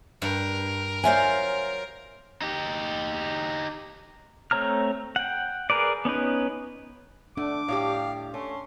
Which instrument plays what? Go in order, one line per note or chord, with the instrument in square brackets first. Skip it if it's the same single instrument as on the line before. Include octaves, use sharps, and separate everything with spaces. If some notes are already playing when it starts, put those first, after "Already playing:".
[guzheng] G2 [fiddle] A#4
[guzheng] F#3 F4 C5 [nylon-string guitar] D5 E5 G#5
[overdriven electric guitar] D#4 G4
[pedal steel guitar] A3 C4 C#5 A#5 F6
F#5 G5
G#4 A#4 B4 D5
B3 C#4 D#4 B4
[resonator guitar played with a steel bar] A3 [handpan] D4 [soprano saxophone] F#5 [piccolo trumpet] D6
[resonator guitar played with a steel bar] A2 G3 G4 [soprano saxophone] F5
[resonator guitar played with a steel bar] A3 [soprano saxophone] C#4 [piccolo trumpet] C6